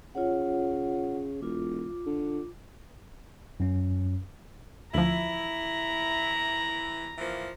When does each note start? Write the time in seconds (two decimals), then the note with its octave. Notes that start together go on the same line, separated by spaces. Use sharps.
0.15 C#3 F4 C#5 F#5
1.42 E1 F4 D6
2.06 D3
3.60 F#2 C#4
4.94 D2 E3 F3 E4 A#5
7.18 E3 F3 A#3